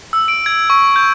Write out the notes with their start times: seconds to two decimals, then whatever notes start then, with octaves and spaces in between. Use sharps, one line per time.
0.13 E6
0.28 D7
0.46 G#6
0.70 C#6
0.96 G6